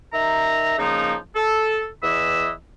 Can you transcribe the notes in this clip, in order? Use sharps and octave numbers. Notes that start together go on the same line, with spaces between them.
D#3 E5 A#5
C#3 F3 A#3 D#4
A4
E2 E3 D#5 B5 E6